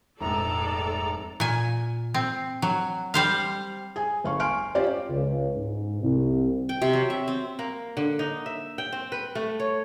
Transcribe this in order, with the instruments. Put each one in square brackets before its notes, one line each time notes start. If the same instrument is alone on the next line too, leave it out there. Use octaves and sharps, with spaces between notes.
[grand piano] F1 A#1 G#2 [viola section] G#3 A4 D5 [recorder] A#5
[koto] A#2 G#5
C4
F#3
G3 C5 F5
[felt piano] G#4 G#5
G1 F5 C#6
G#5 C6 C#6 F6 D7
C#4 F4 G4 C5 D5
[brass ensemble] C#2
G#2
C2
[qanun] G5
C3
F#3
E5
C4
[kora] A#3
D3
D#4
E5
G5
C4
B4
A3
C#5